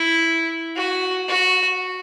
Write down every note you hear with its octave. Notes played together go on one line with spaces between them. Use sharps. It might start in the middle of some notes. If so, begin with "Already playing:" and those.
Already playing: E4
F#4
F#4